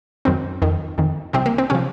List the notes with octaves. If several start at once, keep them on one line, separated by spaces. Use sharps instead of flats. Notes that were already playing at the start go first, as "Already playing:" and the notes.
F#2 D#3 C4
F2 D#3
F2 D#3
C2 C3 F3 C4
A#3
C4
C3 F3 C#4